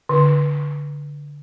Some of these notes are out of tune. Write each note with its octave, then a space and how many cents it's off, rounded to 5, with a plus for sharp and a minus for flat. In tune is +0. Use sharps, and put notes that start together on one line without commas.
D3 -15